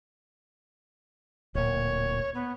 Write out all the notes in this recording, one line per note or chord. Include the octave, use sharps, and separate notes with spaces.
D1 A#2 C#5
B3